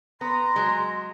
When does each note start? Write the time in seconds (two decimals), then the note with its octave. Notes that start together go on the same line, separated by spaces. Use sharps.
0.21 B3 A#5 C6
0.56 F#3 G#3